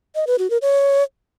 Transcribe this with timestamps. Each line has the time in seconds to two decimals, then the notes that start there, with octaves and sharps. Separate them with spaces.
0.15 D#5
0.27 B4
0.39 F#4
0.50 A#4
0.62 C#5